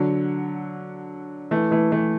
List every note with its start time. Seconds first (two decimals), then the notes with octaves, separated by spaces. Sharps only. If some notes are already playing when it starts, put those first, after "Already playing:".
Already playing: D3 F#3
1.51 E3 A3
1.71 E3 A3
1.92 E3 A3